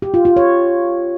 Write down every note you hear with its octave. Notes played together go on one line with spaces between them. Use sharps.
G4
F4
F4
C#5